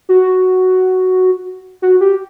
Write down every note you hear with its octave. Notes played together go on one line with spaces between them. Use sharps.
F#4
F#4
G4